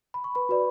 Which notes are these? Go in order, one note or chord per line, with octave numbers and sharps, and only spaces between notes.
B5
C#6
B4 B5
F#4 B4 D5